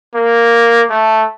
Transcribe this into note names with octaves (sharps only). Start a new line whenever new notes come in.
A#3
A3